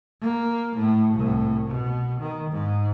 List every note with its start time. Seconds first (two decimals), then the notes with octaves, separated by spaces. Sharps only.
0.22 A#3
0.76 A2
1.14 C2 A2
1.67 B2
2.20 D#3
2.51 G#2